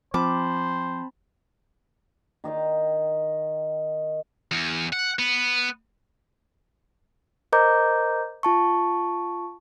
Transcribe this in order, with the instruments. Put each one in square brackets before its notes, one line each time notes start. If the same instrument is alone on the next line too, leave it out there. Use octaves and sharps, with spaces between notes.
[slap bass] F3 [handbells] C4 A5 B5 [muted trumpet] C5 [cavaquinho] D6
[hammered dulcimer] D#3 D#5 F5 G5
[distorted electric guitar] E2
F#5
B3
[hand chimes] A#4 C5 D#5 A#5 D6 G6
F4 A5 C#6